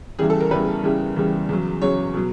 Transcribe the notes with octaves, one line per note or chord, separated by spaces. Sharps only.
E2 C#3 E3 G3 G#4
A4
A#4
E2 C#3 E3 G3 B4
E2 C#3 E3 G3
E2 C#3 E3 G3
E2 C#3 F#3
E2 C#3 F#3 C#5
B2 F#3